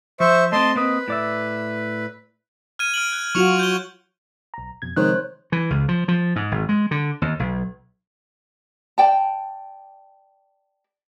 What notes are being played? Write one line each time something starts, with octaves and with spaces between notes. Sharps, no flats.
F3 C5 E5 C#6
A3 C4 D#5 A5 C6
A#3 C4 B4 D#5
A2 D5 E5
F6 G#6 D#7
F6 D7 F#7
F#6
F#3 F4 F#4 C#6 C#7 F7
G6 G7
B1 A#5
F2 B2 G#6
C3 D#3 F3 G#3 C5 C#5 F#6
E3
C#2
F3
F3
G#2
G#1
G#3
D3
D#2
B1
D5 G5 A5